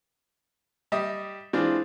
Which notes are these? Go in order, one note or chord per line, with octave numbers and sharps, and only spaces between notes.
G3 G4 D#5 E5 D#6
E3 G#3 C4 D4 F4